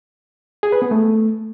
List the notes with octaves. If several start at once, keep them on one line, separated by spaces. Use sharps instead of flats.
G#4
B4
B3
A3